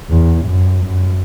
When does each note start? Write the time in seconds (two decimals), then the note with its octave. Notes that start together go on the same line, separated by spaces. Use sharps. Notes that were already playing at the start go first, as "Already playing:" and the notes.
0.09 E2
0.45 F#2
0.82 F#2